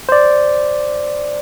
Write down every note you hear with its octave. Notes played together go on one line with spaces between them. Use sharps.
C5 D5